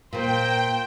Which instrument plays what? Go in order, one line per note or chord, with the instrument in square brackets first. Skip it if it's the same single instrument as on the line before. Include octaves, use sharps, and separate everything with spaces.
[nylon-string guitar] A#2 A#3 [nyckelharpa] A#4 C5 [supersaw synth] G5